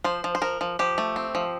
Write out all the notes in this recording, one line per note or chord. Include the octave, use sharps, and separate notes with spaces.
F3 C5
F3
C5
F3 A#4
F3
F3 G4
A3
C4
F3